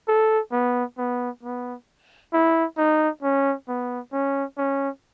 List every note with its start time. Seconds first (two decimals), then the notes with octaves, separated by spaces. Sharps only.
0.08 A4
0.53 B3
0.98 B3
1.43 B3
2.34 E4
2.78 D#4
3.23 C#4
3.68 B3
4.13 C#4
4.58 C#4